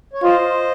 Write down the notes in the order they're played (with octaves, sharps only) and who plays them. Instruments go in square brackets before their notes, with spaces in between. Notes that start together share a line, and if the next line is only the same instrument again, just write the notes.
[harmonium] C#5
[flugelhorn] F4 [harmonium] C5 D#5